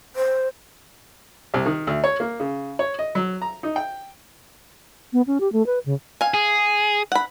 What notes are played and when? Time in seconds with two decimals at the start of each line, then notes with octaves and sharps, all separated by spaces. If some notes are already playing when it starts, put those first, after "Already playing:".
0.16 C5
1.54 C2
1.66 D#3
1.87 D2
2.04 C#5
2.20 A#3
2.40 C#3
2.79 C#5
2.99 D#5
3.15 F#3
3.42 A#5
3.63 D#4
3.76 G5
5.13 B3
5.27 C#4
5.40 G4
5.52 A3
5.66 B4
5.86 C#3
6.21 F5 G#5
6.34 G#4
7.12 F#5 B5